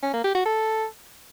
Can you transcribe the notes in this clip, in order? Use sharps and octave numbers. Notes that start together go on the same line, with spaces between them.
C#4
A#3
G4
F#4
A4